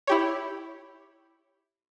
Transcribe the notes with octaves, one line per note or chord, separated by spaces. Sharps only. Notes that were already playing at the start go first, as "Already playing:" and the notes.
E4 G4 C#5